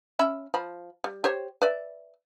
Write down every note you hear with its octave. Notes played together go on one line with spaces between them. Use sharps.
C#4 E5 B5
F3 B5
G3
G4 C5 C#5
B4 D5 E5